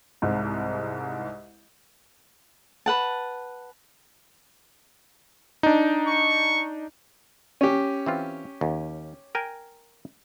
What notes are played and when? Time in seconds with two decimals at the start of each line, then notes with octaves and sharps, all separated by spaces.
0.22 C2 G#2
2.86 B4 F#5 A5
5.63 D4 D#4
6.08 C#6
7.61 C#4 G4
8.06 E3 C4 F4
8.61 D#2
9.35 A#4 G5 G#5